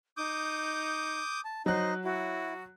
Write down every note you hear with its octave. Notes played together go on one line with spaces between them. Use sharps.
D#4 D6 D#6 G6
A5
F#3 D#4 C5 D#5 F#6
E4 F#4